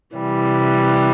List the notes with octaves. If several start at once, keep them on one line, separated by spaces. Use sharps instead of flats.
C3 E3 G3